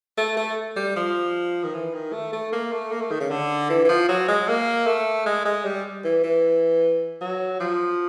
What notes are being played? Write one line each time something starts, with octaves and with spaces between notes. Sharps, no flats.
A3
A3
G3
F3
D#3
E3
D#3
A3
A3
A#3
A3
A#3
A3
D#3
C#3
D3
E3
E3
F3
F#3
G#3
A#3
A3
G#3
G#3
G3
E3
E3
F#3
F3